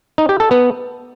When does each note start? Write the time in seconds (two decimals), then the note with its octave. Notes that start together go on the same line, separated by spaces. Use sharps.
0.18 D#4
0.29 G4
0.40 A4
0.51 B3